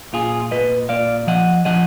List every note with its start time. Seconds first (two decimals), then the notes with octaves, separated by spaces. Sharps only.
0.13 A#2 F4 G#4
0.51 A#2 B4 D#5
0.89 A#2 D5 F5
1.27 F3 D#5 F#5
1.65 F3 D#5 F#5